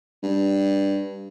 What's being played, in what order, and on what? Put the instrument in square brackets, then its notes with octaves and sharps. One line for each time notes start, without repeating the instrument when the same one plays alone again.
[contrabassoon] G2